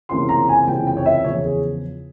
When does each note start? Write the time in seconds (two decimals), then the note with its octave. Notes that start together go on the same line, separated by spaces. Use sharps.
0.09 C#2 C3 E3 A#3 C#4 C6
0.29 A#5
0.49 G#5
0.67 C#2 C3 E3 A#3 C#4 G5
0.87 G5
0.97 C#5
1.06 E5
1.24 E2 C#3 F3 C#5
1.44 G#4